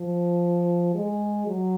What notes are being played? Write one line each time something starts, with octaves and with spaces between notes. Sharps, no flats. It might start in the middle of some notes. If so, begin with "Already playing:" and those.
Already playing: F3
G#3
F#3